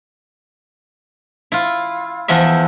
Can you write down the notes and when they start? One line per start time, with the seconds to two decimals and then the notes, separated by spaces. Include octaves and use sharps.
1.52 E4 F4
2.28 E2 F3 E4 E5